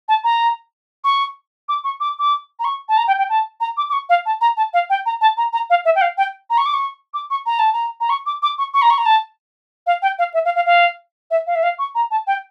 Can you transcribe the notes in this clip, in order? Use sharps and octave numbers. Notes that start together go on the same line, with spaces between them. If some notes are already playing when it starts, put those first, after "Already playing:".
A5
A#5
C#6
D6
C#6
D6
D6
A#5
C#6
A5
A#5
G5
G5
A5
A#5
D6
D6
C#6
F5
A5
A#5
A5
F5
G5
A#5
A5
A#5
A#5
F5
E5
G5
F5
G5
A#5
C#6
D6
C#6
D6
C#6
A#5
A5
A#5
A#5
C#6
D6
D6
C#6
C#6
A#5
C#6
A#5
A5
F5
G5
F5
E5
F5
F5
F5
E5
F5
E5
F5
C#6
A#5
A5
G5